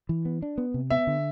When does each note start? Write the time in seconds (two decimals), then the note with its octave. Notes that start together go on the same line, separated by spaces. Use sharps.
0.09 E3
0.25 B3
0.42 D4
0.58 B3
0.74 C3
0.90 B3 E5
1.07 D3